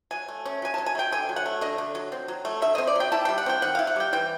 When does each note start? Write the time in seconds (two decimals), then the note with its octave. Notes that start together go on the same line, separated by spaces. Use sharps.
0.11 F#3 G#5
0.28 A3
0.45 C#4
0.62 F#3 G#5
0.74 F#3 A5
0.86 G#5
0.95 A3
0.99 G5
1.12 D3 G#5
1.29 F#3
1.36 F#5
1.46 A3
1.61 D3 D#5
1.78 D3
1.95 F#3
2.12 C4
2.28 F#3
2.45 A3
2.62 D3 E5
2.75 C4 D#5
2.87 D5
2.95 F#3 G5
3.12 E4 A5
3.25 G3 G5
3.38 F#5
3.46 C4 G5
3.62 D#3 F#5
3.75 E4 F5
3.87 F#5
3.96 G3 G5
4.13 E3 G5